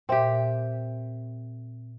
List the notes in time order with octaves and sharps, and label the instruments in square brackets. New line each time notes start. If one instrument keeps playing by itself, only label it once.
[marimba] A#2 E5 [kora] C4 G4